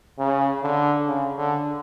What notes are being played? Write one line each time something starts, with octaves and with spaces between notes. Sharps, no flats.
C#3
D3
C#3
D3